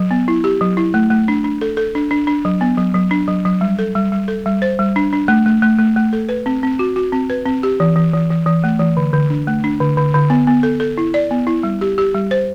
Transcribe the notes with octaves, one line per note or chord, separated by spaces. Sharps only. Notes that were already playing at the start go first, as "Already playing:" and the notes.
Already playing: F#3
B3
E4
G4
F#3
E4
A3
A3
D4
D4
A4
A4
D4
D4
D4
F#3
B3
F#3
F#3
D4
F#3
F#3
G3
A4
G3
G3
A4
G3
C5
G3
D4
D4
A3
A3
A3
A3
A3
A4
B4
C4
C4
F#4
F#4
C4
B4
C4
G4
E3
E3
E3
E3
E3
A3
E3
D3
D3
D4
A3
D4
D3
D3
D3
B3
B3
A4
A4
E4
D5
B3
E4
G3
G4
G4
G3
C5